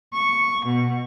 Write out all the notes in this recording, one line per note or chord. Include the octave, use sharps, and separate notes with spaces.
C#6
B2